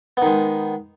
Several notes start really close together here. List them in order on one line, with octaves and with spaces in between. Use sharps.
B3 D#3 G#3